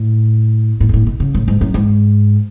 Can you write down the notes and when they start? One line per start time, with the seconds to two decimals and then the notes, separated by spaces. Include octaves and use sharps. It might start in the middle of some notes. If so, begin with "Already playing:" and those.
Already playing: A2
0.80 A2
0.89 G#2
0.93 A2
1.06 B2
1.20 C#3
1.35 A2
1.48 G#2
1.61 F#2
1.74 G#2